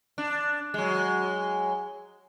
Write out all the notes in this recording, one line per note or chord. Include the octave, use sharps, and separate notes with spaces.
D4
F#3 G#3